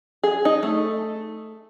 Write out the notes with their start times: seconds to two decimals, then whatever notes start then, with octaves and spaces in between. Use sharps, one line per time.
0.23 G#4
0.45 D#4
0.63 A3